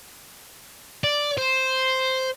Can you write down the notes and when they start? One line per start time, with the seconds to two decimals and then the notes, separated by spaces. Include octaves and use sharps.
1.04 D5
1.38 C5